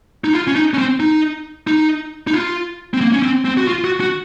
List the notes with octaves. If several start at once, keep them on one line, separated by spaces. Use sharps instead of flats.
D#4
F4
C#4
D#4
C#4
C4
D#4
D#4
D#4
F4
C4
A#3
C#4
C4
C4
F#4
F4
F#4
F#4